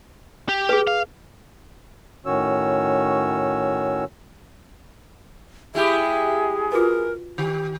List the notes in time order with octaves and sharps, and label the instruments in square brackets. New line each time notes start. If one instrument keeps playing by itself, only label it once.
[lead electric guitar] G4
[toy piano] G#4 B4
[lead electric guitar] F5
[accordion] A2 D#3 C#4 F#4 C#5 E6
[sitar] G#3 E4 G4 [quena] G#4 [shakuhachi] E5
[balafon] F4 F#4 B4 [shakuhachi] A#4
[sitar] D#3 [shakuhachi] G4